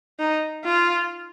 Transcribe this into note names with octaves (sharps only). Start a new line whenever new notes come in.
D#4
F4